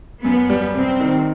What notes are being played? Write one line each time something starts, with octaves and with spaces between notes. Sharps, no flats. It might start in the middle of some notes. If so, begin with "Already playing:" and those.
F#2 B3
G3
C3 C4
D#3